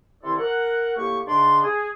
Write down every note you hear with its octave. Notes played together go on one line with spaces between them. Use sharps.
C3 D#3 E4 A4 D5 C6
A#4 F#5
A2 A#3 G4 C#6
G#2 C#3 D4 D5 C6
G#4